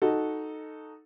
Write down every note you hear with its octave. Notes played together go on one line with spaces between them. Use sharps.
D#4 F#4 A4